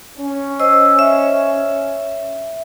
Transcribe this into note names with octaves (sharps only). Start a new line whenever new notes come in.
C#4
C5 D#5 E6
E5